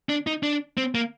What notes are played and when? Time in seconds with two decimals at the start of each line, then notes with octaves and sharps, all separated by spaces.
0.09 D4
0.27 D#4
0.43 D4
0.77 C4
0.95 A#3